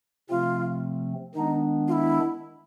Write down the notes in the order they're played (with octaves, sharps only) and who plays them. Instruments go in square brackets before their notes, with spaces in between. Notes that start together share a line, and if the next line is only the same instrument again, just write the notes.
[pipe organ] C3 F3 A3 C4 [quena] F4
[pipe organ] D#3 G#3 B3 D4 [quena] D#4
[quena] F4
E4